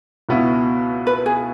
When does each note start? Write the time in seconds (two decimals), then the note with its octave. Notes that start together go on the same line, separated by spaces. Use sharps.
0.29 C#2 B2 B3 E4
1.07 B4
1.26 G#4